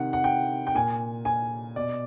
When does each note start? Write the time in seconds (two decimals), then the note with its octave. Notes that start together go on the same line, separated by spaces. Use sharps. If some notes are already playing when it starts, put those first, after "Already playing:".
Already playing: C3 D#3 F#5
0.13 F#5
0.24 G5
0.67 G5
0.75 A#2 G#5
1.25 G#5
1.76 B2 D5